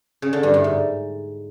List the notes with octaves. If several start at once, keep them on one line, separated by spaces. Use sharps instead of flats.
C#3
D3
G2
A2
G#2